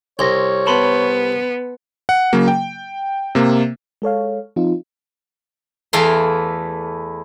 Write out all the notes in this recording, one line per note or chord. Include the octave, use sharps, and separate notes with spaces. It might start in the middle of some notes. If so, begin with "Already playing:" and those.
C2 C#5 C6 A#6
B3 A5 B5 C6
F#5
C#3 F#3 A#3
G5
C3 A#3
G#3 A4 C#5 F5
F3 C4 D#4 F4
E2 E3 A3 F5 A#5 C6